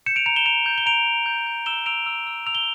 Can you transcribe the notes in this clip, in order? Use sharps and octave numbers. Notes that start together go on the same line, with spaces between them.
G6 C#7 E7
D7 F7
A#5 D7 F7
E7 G7
A#5 D7 F7
G6
G7
A#5 D7 F7
A#5
G6
G6
E6 E7 G7
E6 D7 F7
E6
E6
E6 F7
G7